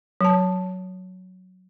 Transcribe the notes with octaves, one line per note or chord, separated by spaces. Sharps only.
F#3 A5